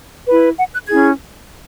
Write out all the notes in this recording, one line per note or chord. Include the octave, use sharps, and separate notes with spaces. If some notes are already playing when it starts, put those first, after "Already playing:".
E4 B4
F#5
F#6
C#4 E4 G#4 G#6